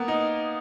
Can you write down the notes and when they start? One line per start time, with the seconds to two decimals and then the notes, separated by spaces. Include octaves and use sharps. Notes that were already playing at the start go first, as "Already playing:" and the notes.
Already playing: A#3 B3
0.08 D#4